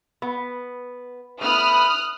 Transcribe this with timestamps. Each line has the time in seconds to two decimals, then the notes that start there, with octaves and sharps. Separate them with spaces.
0.22 B3
1.41 A3 B3 E4 D#6 F6 F#6